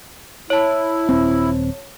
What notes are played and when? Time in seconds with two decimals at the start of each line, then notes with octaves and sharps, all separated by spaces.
0.50 E4 C#5 A5
1.09 D#1 C4